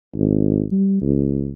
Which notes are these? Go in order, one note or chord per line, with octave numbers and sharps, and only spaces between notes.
G#1
G3
C#2